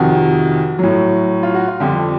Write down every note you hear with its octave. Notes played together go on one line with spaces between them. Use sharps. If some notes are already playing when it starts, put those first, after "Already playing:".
Already playing: F2 C3 D#3 F#4
A2 F#3
F4
F#4
F4
F2 D3 G3 G4